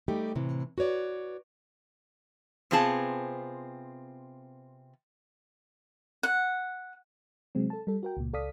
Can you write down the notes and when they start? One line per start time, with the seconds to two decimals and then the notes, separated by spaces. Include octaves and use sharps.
0.08 G3 A3 D#4 G4
0.35 A2 C3 E3
0.78 F#4 B4 C#5 D5
2.71 C3 B3 C4 F4 G#4 A5
6.23 F#5
7.55 C3 F#3 G#3 C4
7.70 A4 A5
7.87 G3 A4
8.03 F#4 A#4 G5
8.17 C#2 A#2
8.33 C#2 A4 D5 F5 D#6 B6